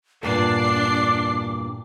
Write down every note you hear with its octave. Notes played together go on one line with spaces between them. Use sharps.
E2 G2 A#2 D4 D5 D6 C7